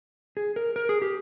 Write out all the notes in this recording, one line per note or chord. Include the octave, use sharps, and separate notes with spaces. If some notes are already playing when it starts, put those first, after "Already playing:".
G#4
A#4
A#4
G#4
G4